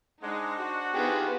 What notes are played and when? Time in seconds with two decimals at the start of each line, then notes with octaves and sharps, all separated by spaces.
0.22 G#3 D4 D#4 C5 F#5
0.58 F#4
0.94 D#3 B3 F4 G4 G#4